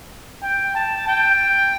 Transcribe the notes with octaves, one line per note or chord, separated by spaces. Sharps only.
G5
A5
G5